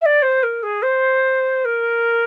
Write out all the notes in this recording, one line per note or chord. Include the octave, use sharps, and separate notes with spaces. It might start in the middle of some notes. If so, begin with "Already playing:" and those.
E5
D5
C5
A#4
G#4
C5
A#4